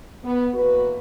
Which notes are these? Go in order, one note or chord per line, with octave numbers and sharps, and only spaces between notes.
B3
E2 A#3 F#4 B4